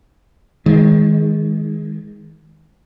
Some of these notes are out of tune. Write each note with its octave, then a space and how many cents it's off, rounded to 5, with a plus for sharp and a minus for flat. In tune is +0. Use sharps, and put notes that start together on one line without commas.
D#3 +30 G#3 +0